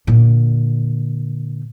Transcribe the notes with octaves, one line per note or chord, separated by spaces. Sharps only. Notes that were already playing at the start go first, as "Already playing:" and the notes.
A#2 D3